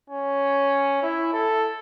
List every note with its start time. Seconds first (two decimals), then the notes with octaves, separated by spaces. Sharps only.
0.10 C#4
1.03 E4
1.33 A4